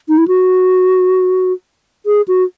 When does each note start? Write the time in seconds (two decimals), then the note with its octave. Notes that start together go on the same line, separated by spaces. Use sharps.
0.09 D#4
0.18 E4
0.28 F#4
2.06 G#4
2.28 F#4